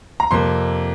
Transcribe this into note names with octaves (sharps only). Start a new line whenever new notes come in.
A#5
F2 C3 A#3 C6